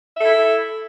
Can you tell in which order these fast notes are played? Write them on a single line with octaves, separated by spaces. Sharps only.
E5 A4 E4